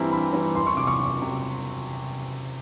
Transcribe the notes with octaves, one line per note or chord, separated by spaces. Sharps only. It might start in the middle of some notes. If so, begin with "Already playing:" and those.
Already playing: G2 E3 G3 C4 E4 A#5
G2 B5
E3 G3 C4 E4
F#1 C6
C#6
E2 C3 D6
C#6
F#1
C3